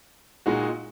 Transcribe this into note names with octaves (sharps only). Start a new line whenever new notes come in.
A#2 G#3 D#4 F#4